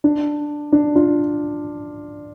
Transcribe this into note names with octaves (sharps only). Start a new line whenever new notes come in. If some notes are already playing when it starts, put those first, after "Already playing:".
D4
D4
D4 F4